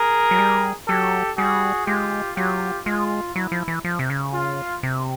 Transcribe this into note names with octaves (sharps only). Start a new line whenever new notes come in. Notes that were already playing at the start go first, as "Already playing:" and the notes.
Already playing: G#4 A#4
F#3
G3
F#3 G4 A4
G3 F#4 G#4
G#3 F4 G4
F#3 F4 G4
G#3 F4
F#3 E4
F3
E3
F3
C3
C#3
F4
C3